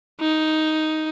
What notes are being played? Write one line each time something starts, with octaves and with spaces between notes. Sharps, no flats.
D#4